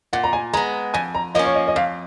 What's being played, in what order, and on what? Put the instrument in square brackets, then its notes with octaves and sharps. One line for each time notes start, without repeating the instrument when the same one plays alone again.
[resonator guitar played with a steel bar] A#2 [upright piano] F#5
[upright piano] A#5
G#5
[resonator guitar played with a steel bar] G#3 [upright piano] A#5
[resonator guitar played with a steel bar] B3
[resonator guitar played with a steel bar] F2 [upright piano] G#5
[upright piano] A#5
[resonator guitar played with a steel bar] F3 A#3 C#4 [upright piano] D#5
[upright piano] C#5
D#5
D#5
[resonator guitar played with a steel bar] F2 [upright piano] F5